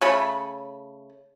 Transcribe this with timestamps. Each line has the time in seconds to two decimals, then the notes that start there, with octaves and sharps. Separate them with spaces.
0.01 C#3 A3 B5